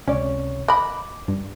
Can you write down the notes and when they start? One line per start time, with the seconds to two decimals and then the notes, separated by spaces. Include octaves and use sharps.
0.08 C#2 C3 C#4 C#5 D5
0.68 D#5 B5 D6
1.28 G2